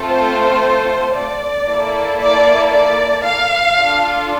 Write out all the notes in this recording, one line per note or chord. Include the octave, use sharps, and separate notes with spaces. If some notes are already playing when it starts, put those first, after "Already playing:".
Already playing: A3 C4 F4 A4
C5
D5
A#3 E4 A4
D5
D5
F5
D4 F4 A4